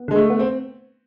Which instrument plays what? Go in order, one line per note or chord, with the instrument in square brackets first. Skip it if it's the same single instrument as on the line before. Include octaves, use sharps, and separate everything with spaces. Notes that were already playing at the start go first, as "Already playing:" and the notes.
Already playing: [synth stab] B3
[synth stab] D3 [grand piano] G#3
[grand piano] A3
[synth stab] B3
[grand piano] C4